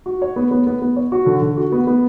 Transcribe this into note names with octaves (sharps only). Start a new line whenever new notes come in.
F#4
C#5
B3
B3
B3
B3
C#5
F#4
D3
D3
F#4
B3
B3